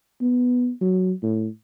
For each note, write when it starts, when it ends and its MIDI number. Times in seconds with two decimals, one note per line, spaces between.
0.21 0.70 59
0.81 1.13 54
1.23 1.47 45